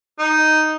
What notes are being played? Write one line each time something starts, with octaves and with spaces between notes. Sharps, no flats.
D#4